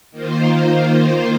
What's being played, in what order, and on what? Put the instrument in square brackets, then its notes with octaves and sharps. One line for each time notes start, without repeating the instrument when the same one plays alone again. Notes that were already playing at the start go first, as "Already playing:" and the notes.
[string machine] D#3 A#3 F4 C5